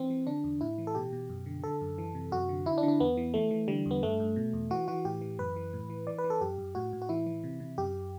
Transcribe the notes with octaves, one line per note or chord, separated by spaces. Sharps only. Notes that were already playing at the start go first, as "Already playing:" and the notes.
Already playing: E3 C4
E3
D3 D4
E2
A2 E4
E3
A4
B2 G4
B2
F#2
D3
D3 A4
F#2
E3
C3
F#2 F#4
D3
D3 E4
D4
D3
D4
E2 B3
E3
E3 A3
E3
D3 G3
E2
B3
G2 A3
G2
B2
E2
E3 F#4
E3 F#4
A2 G4
E3
F#2 B4
E3
A2
E3
E3 D5
B4
E3
A4
F#2 G4
F#2
A2 F#4
A2
F#4
E3 E4
E3
C3
C3
F#2 G4